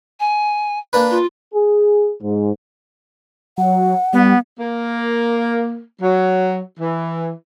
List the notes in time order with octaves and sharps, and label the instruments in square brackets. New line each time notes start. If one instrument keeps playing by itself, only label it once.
[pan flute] G#5
[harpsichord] A#3 D4 B4
[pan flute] F4
[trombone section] G#4
G#2
[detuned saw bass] F#3 [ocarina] F#5
[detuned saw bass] G3 [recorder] B3
[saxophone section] A#3
F#3
E3